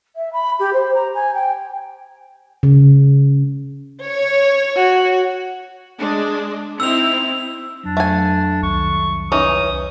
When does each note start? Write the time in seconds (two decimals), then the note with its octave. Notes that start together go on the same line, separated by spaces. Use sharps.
0.16 E5
0.33 B5
0.59 G4
0.73 C5
0.94 A#5
1.14 G#5
1.34 G5
2.63 C#3
4.03 C#5
4.76 F#4
5.97 G#3 D4
6.80 C4 D#4 E4 E6 F7
7.84 F2 F#3 D4
7.97 A3 G#5
8.63 C2 D#3 C#6
9.32 E3 C#4 D#4 D#6